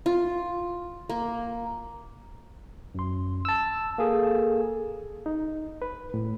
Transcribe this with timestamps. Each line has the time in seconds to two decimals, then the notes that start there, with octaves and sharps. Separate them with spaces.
0.06 F4
1.09 A#3
2.95 F#2 C6
3.45 A5 E6
3.98 A#3 G#4 A4
5.26 D#4
5.82 B4
6.14 A2